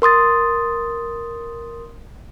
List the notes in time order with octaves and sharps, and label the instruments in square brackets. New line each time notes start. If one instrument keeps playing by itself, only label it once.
[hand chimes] A#4 C6 D#6 A6